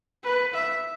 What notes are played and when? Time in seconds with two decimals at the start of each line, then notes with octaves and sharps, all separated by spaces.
0.23 B4
0.54 E5